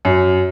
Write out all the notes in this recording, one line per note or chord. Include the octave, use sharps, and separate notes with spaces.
F#2